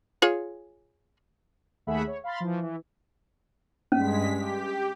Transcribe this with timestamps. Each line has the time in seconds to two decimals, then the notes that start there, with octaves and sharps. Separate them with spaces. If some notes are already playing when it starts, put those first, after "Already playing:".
0.22 F4 G#4 C#5
1.87 D#2 A3 G#4 E5 F#5 B5
2.07 C#5
2.24 F5 B5 C6 A6
2.40 E3 F3
2.62 E3
3.92 G2 G#3 C#4 B6
4.36 G4